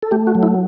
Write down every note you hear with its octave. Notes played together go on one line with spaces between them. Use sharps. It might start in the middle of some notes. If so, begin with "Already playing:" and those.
A4
A3 G4
F#4
F#3
E4